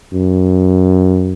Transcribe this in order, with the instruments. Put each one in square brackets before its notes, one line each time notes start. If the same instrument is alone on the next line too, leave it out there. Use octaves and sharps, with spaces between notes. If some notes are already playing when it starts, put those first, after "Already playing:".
[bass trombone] F#2